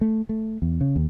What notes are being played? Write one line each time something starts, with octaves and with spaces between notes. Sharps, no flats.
A3
A3
E2
C#3
D#2